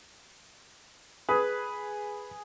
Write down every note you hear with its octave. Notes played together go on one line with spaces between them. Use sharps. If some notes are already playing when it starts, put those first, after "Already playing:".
G#4 B4